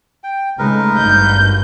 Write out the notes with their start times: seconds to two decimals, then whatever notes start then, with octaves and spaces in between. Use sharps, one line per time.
0.24 G5
0.59 C#3 G#3 A3 D#4 A#4 B4
0.97 G#1 G2 G6